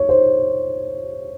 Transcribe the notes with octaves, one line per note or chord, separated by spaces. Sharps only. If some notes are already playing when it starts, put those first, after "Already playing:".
Already playing: C#5
C5